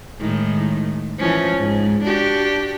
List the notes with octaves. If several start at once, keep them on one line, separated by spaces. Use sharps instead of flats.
A2 D#3 G#3
E3 F3 C#4
G#2
D4 F#4 G4